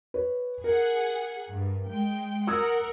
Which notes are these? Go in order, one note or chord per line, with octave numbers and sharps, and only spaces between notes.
B4 C#5
G#4 A#4 F#5
G2
G#3 G5
A#4 F#5 D#6 E6 G#6